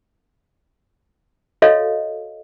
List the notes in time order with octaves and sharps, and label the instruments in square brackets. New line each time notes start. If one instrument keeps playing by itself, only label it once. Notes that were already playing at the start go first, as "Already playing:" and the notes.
[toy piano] F#4 A4 C#5 D#5 F5